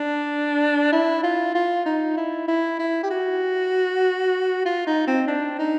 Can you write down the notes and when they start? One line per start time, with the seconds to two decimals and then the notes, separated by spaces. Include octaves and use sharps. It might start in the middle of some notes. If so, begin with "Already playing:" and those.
Already playing: D4
0.92 E4
1.23 F4
1.55 F4
1.85 D#4
2.17 E4
2.48 E4
2.79 E4
3.03 G4
3.10 F#4
4.65 F4
4.86 D#4
5.07 C4
5.27 D4
5.58 D#4